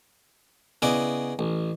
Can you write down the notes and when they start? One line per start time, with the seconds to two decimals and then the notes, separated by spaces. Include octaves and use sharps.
0.82 C#3 B3 E4 D5 D#5
1.39 A1